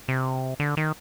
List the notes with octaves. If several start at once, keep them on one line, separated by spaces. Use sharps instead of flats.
C3
D3
D#3